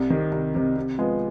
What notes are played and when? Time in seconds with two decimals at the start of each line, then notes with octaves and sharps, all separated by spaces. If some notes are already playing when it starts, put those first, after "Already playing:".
Already playing: C2
0.10 C3 D#3
0.32 C2
0.54 C3 D#3
0.76 C3
0.98 F3 G#3 B3